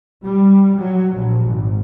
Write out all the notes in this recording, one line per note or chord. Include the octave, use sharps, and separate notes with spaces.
G3
F#3
A#1
G#1